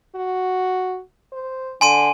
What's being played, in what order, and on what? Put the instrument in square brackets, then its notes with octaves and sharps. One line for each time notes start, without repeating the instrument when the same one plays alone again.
[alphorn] F#4
C5
[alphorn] D3 [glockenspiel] G#5 C6 D#7